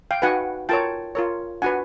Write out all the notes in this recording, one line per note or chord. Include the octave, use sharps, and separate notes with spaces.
F5 G5
D#4 F#4 B4 F#5 G#5
F4 A#4 C#5 G5 A5
F4 A#4 C#5
D4 F#4 B4 F#5 G#5